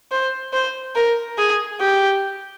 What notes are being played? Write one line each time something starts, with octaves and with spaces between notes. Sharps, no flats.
C5
C5
A#4
G#4
G4